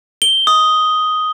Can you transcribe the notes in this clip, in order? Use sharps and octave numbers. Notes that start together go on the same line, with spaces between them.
G7
D#6